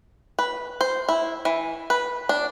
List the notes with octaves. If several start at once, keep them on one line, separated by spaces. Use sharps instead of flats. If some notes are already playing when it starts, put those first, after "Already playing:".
B4
C5
E4
E3
B4
D4